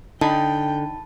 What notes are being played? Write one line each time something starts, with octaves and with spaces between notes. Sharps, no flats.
D3 D#4 G5 A5 B5